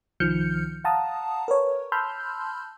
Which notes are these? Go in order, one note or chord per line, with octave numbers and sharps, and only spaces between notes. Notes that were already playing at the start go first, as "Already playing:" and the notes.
C2 D#3 F3 F6 G6 C#7
F5 F#5 A5 A#5 D#6
A#4 B4 C#5
A5 B5 C6 E6 F6 G6